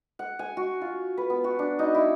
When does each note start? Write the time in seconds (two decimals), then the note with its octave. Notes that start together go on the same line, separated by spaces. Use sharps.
0.19 F#5
0.39 G#5
0.57 F#4
0.81 F4
1.18 B4
1.30 B3
1.44 F#4
1.59 D4
1.79 D#4
1.95 E4